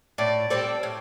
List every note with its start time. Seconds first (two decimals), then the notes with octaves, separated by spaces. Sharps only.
0.18 A2 D5
0.50 G3 C4 A4 D5
0.83 A2